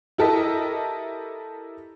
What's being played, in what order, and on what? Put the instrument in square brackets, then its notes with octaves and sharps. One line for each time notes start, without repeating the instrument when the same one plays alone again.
[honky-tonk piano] E4 G4 A4 A#4 D#5 E5